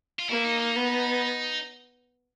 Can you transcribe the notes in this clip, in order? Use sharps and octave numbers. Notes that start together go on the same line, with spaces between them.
F4
A#3 E4
D#4
D#4
B3